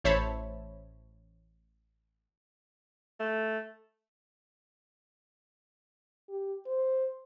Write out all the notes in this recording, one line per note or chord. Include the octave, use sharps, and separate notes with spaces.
A1 C5 C#5 E5 A5 B5
A3
G4
C5